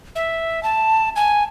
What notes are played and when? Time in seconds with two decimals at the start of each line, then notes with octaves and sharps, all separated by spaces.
0.16 E5
0.63 A5
1.16 G#5